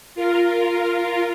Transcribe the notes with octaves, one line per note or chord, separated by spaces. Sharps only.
F4 A#4